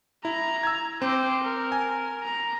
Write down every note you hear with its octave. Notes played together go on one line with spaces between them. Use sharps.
E4 A#5
E6 G#6
C4 C5 D6
A#4
G#5
A#5